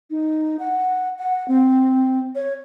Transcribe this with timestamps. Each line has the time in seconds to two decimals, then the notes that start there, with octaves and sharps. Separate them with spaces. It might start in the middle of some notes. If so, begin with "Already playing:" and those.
0.10 D#4
0.59 F#5
1.18 F#5
1.48 C4
2.35 C#5